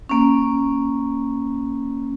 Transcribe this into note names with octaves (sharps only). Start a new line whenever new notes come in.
A#3 C#4